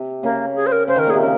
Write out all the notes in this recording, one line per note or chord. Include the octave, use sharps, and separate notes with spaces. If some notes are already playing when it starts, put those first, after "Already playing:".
Already playing: C3
C#3 A#3
G#4
C5
A#4
C#3 C5
D#3 A#4
A#2 G#4
C3
C#3 A#4